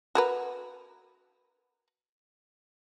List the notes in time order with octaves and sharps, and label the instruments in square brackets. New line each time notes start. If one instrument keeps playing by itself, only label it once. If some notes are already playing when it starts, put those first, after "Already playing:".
[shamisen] F#4 A#4 B4